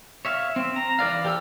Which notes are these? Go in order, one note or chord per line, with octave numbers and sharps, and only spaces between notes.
C#5 E5 F5
C4
A#5
E3 B4 D5 F5
G4 A4 C5 F5 E6